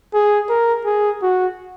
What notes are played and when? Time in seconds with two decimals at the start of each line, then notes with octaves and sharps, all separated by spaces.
0.14 G#4
0.49 A#4
0.85 G#4
1.22 F#4